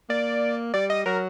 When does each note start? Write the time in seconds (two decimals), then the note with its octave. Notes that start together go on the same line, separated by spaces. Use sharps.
0.09 A#3 D5
0.74 G3 D5
0.90 D#5
1.06 F#3 A#4